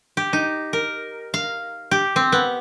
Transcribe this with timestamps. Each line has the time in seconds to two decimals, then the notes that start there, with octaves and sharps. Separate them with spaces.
0.17 G4
0.33 D#4
0.73 A#4
1.34 F5
1.91 G4
2.16 C4
2.32 B3